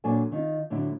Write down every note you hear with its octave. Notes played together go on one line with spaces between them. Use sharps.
A#2 F#3 D4 A4 G#5
D#3 D#4 F4
A2 D3 F#3 A3 D4 E4